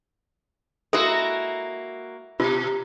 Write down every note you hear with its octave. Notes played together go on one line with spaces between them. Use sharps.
G#3 A#3 E4 F#4 A4
B2 F4 G4